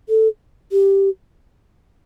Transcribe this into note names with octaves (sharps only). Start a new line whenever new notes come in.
A4
G4